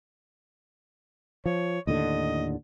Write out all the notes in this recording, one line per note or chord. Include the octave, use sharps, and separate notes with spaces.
F3 C#5
D#2 A2 D3 D#5